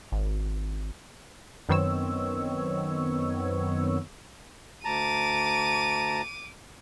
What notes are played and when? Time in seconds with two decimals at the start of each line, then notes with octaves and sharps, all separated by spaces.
0.12 G#1
1.69 F#2 D#3 B3 C4 C#5 E6
4.85 D2 A5 A#5 D6 D#7